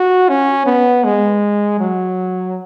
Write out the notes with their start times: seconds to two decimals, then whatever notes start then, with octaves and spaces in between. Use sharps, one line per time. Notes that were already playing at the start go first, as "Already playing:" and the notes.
Already playing: F#4
0.29 C#4
0.66 B3
1.04 G#3
1.80 F#3